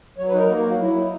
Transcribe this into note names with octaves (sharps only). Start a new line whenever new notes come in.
F#3 C#5
B4
D#4
A#4
A#3 F#4
F#4
F#3
F#4
F#3 E4
D#4